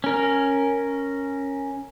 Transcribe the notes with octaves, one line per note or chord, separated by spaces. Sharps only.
C#4 A#4